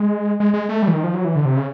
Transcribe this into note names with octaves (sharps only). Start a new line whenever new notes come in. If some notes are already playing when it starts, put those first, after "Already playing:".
Already playing: G#3
G#3
G#3
A3
G3
E3
D#3
F3
F#3
E3
D3
C3
C#3